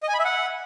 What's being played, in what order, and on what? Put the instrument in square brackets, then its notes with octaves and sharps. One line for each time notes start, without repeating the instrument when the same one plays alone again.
[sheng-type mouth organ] D#5
G#5
B5
E5
F#5